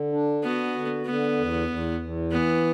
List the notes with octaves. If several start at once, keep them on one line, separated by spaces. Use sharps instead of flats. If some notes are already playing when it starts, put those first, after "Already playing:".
Already playing: D3
D4
B3 F#4
D3
D3 B3
E2
E2
E2
E3 B3